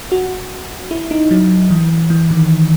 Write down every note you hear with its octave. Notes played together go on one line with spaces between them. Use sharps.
F#4
E4
D#4
F#3
E3
E3
D#3